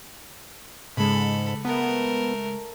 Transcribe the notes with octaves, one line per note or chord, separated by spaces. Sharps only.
G#2 C#3 G#3 A4 B5
A3 B3 A#4